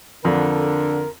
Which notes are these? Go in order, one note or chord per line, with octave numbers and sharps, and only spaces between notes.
F2 D3 A#4